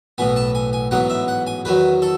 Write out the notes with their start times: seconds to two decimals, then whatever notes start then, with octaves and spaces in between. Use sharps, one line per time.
0.18 B1 A2 E3 B3 G#5
0.36 A5
0.55 G#5
0.73 G#5
0.91 A1 G#2 F#3 B3 F#5
1.10 E5
1.28 F#5
1.47 G#5
1.65 E2 D#3 F#3 B4
2.02 A4